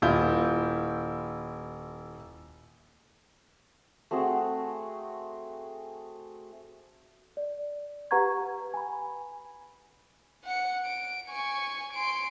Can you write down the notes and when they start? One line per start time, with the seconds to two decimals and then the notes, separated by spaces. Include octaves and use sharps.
0.02 D#1 E4 F4 G6
4.11 A3 C4 F#4 G#4
7.37 D5
8.11 G4 B4 F#5 A#5 C#6 G#6
8.74 G#5 B5
10.45 F#5 C#7
10.85 D7
11.30 G#5 C#6
11.93 C6 D7